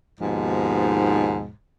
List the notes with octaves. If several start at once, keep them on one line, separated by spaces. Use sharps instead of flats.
D#2 G#2 B2 F3